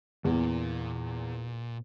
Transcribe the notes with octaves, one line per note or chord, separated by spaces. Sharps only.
E2 A#2